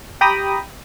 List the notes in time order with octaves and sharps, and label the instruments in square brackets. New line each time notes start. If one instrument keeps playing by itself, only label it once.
[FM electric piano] G4 G5 A#5 B5 D#6